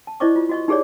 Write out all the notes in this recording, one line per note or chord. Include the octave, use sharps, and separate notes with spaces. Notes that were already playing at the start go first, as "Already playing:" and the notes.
A5
E4 C5 D5 D#5 C#6 D6
F4
F#4 D#5 C#6
D#4 G4 G#4 C#5 D5